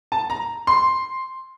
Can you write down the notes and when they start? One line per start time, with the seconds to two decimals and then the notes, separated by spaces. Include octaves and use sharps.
0.12 A5
0.30 A#5
0.67 C6